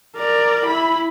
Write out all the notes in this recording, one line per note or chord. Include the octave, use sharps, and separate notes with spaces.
A#4 D5
E4 B5